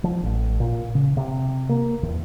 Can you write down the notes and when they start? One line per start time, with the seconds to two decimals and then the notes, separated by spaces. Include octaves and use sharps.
0.04 F3
0.23 A1
0.60 A#2
0.95 C#3
1.17 C3
1.69 A#3
2.03 E2